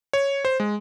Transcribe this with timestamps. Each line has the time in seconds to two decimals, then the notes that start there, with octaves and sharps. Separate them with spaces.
0.13 C#5
0.45 C5
0.60 G#3